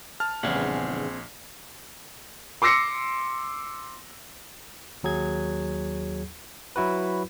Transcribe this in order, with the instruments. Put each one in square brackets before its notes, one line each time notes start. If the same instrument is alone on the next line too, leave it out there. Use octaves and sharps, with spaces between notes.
[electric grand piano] A5 F6
[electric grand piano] A#1 [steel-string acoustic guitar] E2 G2 C#3 [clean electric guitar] C4 G#4 F#5
[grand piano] C6 D6 E6 A#6 C7 C#7
[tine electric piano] D#2 F#3 G#4 G#6
F#3 E4 F#4 B4